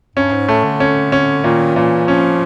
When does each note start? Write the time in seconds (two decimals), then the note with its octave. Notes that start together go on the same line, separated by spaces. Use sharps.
0.16 G2 C#4
0.32 G#2
0.48 A2 A3
0.64 D3
0.80 C#4
1.12 C#4
1.44 A#2 D#3
1.76 A#2 E3
2.08 F3 C#4